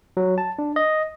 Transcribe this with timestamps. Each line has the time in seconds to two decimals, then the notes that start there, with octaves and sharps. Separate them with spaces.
0.17 F#3
0.38 A5
0.59 D4
0.76 D#5